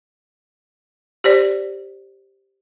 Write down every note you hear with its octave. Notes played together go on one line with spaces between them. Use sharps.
G4 C5 D5